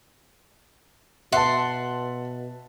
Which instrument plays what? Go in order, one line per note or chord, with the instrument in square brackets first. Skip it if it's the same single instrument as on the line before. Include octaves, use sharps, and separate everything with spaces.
[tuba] B2 [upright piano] E5 A5 [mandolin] F#5 C6